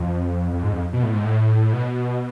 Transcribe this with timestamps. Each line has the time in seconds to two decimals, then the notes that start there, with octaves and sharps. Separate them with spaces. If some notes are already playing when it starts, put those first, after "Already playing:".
Already playing: F2
0.53 F2
0.63 G#2
0.73 F2
0.93 B2
1.03 A2
1.14 G#2
1.24 A2
1.73 B2